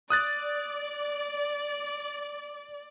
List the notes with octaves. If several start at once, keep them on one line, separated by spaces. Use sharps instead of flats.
D5 D#6 F#6 A6